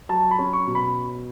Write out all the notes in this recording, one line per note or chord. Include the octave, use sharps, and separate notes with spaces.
F#3 A5
B5
C#4
C#6
B2
B5